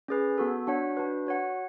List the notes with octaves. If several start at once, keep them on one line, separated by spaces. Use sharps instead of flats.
C#4 G#4 B4
B3 F#4 A4
D4 F#4 C#5 F#5
D4 F#4 B4
F#4 C#5 F#5